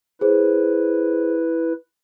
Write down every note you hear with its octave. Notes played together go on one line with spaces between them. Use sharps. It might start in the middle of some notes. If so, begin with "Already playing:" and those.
E4 G#4 B4 C5